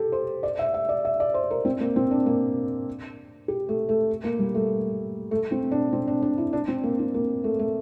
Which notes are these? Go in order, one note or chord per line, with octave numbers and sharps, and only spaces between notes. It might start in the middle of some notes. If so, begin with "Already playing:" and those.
Already playing: G4 A4
C5
D5
E5
E5
D5
E5
D5
C5
A#4
C4
A#3
C4
D4
A#3
G4
A3
A3
A#3
G3
A3
A3
C4
D4
C4
D4
D4
E4
D4
C4
A#3
C4
A#3
A3
A3